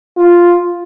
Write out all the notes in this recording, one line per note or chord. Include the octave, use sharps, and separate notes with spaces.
F4